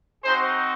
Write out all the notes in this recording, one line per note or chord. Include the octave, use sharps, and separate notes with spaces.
C4 D#4 F#4 G#4 C5